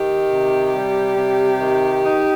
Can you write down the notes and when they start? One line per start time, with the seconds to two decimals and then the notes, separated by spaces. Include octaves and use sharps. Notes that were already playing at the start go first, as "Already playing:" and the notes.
Already playing: D#3 G4
0.29 C3
0.73 G3
1.16 C3
1.59 D#3
2.02 D#4